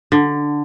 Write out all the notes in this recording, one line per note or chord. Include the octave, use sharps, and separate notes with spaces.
D3